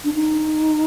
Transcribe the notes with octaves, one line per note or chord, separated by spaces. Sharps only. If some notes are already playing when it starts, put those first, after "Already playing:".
D4
D#4